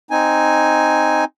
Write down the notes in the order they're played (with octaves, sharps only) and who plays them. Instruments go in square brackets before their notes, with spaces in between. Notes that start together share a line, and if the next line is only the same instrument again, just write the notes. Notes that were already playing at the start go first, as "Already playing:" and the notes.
[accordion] C4 D#4 G#5